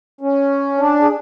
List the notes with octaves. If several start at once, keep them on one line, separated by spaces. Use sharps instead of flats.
C#4
D4
G#4